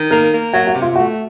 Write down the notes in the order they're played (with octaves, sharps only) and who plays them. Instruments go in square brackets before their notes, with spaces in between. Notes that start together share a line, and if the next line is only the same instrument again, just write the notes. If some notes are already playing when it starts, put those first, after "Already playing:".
Already playing: [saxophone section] D#3
[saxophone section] A#3 [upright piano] A#4
[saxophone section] A#3
[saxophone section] F#3 [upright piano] F#4
[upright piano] F#4
[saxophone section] C3
[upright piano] F4
[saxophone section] A3 [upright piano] F#4